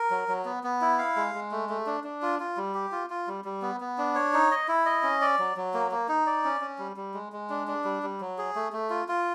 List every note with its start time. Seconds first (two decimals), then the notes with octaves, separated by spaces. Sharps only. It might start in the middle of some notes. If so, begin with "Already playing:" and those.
Already playing: A#4
0.11 F#3
0.28 F#3
0.45 B3
0.64 B3
0.81 E4
0.99 F5
1.16 G#3
1.34 G#3
1.51 A3
1.69 A3
1.86 D4
2.04 D4
2.22 F4
2.40 F4
2.57 G3
2.74 G4
2.92 F4
3.10 F4
3.27 G3
3.45 G3
3.62 B3
3.80 B3
3.98 D4
4.15 C#5
4.33 D#4
4.51 D#5
4.68 E4
4.86 D#5
5.03 C#4
5.21 D5
5.39 F#3
5.57 F#3
5.74 A#3
5.91 A#3
6.08 D#4
6.26 D5
6.44 C#4
6.61 C#4
6.79 G3
6.97 G3
7.14 G#3
7.33 G#3
7.50 D4
7.67 D4
7.84 G3
8.03 G3
8.20 F#3
8.38 G#4
8.55 A3
8.73 A3
8.90 F4
9.08 F4